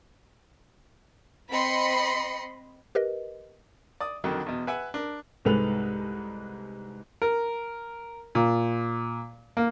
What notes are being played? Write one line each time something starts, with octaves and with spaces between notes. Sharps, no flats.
C4 D#5 B5 C6 C#7
G4 A#4 B4 D#5
D5 D#6
F2 D3 D#3 F#3
E2 B2
B4 E5 F#5 G#5
D4 A#4
C2 G#2 G#3 A4 B4 F7
A#4
A#2
A#3